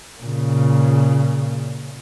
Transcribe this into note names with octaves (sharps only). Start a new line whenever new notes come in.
A#2 C#3